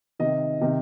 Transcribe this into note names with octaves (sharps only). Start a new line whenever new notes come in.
C3 D#3 D#5
C3 D#3